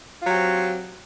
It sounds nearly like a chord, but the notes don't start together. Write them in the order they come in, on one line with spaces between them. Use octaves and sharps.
F4 F#3 G4 C4